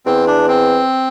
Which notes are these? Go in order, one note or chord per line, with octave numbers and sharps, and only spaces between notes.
E2 C4
D4
C4